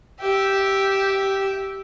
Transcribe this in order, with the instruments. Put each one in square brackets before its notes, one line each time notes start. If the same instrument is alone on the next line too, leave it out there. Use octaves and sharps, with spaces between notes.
[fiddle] G4 E5